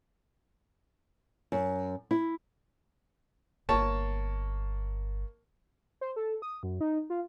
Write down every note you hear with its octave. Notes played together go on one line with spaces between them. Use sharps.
F#2
E4
D1 G1 A#3 C#5 A5
C5
A4
D#6
F#2
D#4
F4